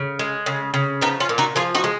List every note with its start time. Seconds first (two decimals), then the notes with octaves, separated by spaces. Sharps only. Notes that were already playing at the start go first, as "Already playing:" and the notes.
Already playing: C#3
0.19 G#3
0.46 C#3
0.74 C#3
1.01 F3 B3 D#4
1.20 C#4 F4
1.29 A#2
1.38 D#4 F#4
1.56 F3 F4 G#4
1.75 D#4 F#4
1.84 G#3